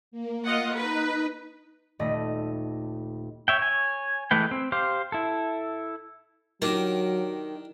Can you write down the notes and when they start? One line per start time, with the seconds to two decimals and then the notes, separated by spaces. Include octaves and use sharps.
0.11 A#3
0.44 F4 D#5 F#5
0.75 D#4 B4 A#5
1.99 D#1 A3 D#5
3.48 C#5 E5 G5
3.59 C#5 G#5
4.31 E3 G#3 A3 B4 G5
4.51 C4
4.72 G4 C5 F5
5.12 E4 A4
6.62 D#3 F#3 D4 G4 A#4